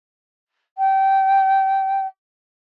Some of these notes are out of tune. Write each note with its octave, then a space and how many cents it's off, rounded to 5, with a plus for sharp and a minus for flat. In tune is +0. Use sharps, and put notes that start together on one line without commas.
G5 -20